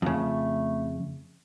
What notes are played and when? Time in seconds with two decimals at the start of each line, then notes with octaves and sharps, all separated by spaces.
0.02 F2 C#3 A3